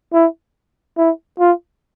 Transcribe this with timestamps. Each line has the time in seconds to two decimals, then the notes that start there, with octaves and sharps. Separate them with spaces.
0.14 E4
0.98 E4
1.40 F4